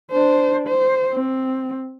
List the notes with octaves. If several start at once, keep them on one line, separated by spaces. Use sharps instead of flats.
D4 C5
C5
C4